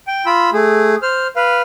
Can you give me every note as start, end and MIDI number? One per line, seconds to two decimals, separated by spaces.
0.07 0.26 79
0.26 0.50 65
0.26 0.50 83
0.26 0.50 88
0.53 0.95 57
0.53 0.95 68
1.02 1.27 72
1.02 1.27 89
1.36 1.62 71
1.36 1.62 77